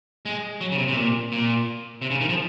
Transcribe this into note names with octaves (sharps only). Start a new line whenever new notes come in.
G#3
F#3
C#3
C3
C3
A#2
A#2
C3
C#3
D#3
F3